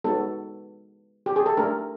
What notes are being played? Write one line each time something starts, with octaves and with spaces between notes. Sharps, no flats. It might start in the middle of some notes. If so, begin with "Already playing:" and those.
G#3 B3 D#4 F#4 A4
G4
G#4
A4
A3 D4 G4 A#4